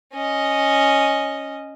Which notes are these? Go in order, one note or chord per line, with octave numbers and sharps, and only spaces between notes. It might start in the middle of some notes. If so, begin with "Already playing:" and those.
C#4 D#5